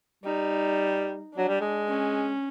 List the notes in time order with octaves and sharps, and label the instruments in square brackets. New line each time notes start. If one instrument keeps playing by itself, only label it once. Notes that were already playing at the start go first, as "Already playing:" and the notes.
[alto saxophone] G3 [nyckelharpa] D#4
[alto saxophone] F#3 [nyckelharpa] D4
[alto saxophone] G3
G#3
[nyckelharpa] C#4